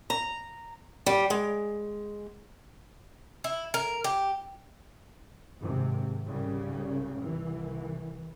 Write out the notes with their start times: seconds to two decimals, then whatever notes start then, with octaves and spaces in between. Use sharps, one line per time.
0.10 A#5
1.06 G3
1.30 G#3
3.44 E4
3.74 A#4
4.04 G4
5.59 G#1 G#2 C3
6.27 C2 G#2 C#3 G3
7.21 C2 E3